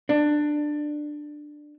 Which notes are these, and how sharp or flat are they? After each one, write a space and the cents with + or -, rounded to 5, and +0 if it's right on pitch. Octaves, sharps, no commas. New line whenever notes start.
D4 +15